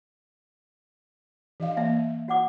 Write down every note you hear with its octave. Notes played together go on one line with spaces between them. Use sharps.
E3 D#5 F5
A#3 E5
F#4 F#5 D6